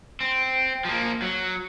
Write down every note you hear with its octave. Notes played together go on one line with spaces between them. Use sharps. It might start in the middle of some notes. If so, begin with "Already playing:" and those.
C4
F3 A#3
F#3